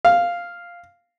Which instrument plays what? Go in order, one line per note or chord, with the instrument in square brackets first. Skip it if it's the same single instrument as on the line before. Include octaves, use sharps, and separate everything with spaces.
[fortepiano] F5